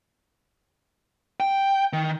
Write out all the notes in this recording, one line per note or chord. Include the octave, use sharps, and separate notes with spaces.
G5
D#3